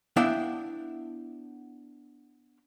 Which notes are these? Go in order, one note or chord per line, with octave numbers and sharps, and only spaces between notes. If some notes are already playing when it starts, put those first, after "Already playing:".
B3 D4 E4 E5 F5 G5